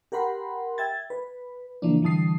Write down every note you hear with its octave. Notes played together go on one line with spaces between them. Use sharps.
G4 A#4 F#5 B5 C6
E5 G5 G#6 A6
B4
C#3 E3 F3 A#3 D4
D3 E3 G3 A5 D#6 C7